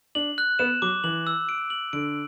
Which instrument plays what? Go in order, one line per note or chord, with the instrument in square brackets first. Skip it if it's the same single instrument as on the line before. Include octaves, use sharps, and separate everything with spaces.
[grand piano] D4 [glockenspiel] F#7
[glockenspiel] F#6
[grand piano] B3 [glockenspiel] E7
[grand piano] F#3 [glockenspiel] D6
[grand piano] E3 [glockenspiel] F#7
[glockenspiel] E6
D7
F#7
[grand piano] D3 [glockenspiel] D7